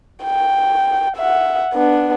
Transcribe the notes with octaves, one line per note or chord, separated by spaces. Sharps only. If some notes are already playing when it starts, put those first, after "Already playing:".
G5
E5 F#5
B3 D4